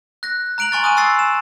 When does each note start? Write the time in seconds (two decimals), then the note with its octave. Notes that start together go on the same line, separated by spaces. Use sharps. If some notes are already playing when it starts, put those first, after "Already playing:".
0.23 F#6 A#6
0.58 A#5 F#6 D7 F7 F#7
0.72 G#5 C6 C#6 F6 A6
0.84 D#6 F#6 D#7
0.97 C6 D#6 E6 A6 C7
1.19 E7